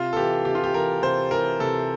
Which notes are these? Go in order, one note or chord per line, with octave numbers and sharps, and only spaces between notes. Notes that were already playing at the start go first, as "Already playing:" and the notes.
Already playing: C3 F4
A4
E3 G4
C3 G4
F4
G4
E3 A#4
C3 C5
E3 A#4
C3 A4